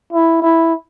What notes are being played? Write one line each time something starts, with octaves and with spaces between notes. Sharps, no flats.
E4
E4